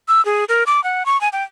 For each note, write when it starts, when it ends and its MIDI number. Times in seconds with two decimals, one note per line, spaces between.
0.08 0.24 88
0.25 0.45 68
0.49 0.64 70
0.67 0.83 86
0.84 1.06 78
1.06 1.19 85
1.21 1.29 80
1.33 1.44 79